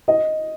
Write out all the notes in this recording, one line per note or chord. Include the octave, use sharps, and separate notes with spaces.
D#5